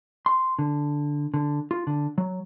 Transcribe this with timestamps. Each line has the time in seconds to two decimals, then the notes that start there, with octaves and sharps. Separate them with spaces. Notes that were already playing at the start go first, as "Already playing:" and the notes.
0.26 C6
0.59 D3
1.34 D3
1.71 F4
1.87 D3
2.18 F#3